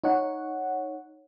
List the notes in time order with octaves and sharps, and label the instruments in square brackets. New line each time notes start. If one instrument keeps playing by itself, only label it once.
[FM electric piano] D#4 C#5 F#5